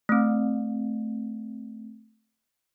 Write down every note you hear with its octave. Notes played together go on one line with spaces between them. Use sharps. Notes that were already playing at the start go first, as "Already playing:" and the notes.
A3 C4